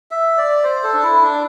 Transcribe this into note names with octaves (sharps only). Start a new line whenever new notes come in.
E5
D5
C5
A4
D4
E4
D4